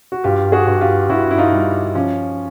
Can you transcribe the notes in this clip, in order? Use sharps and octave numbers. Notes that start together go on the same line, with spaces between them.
F#4
G2 F4 G4
F#4 G#4
G2
F4 G4
G2 E4 F#4
E4
D#4 F4
G3
F3 C#4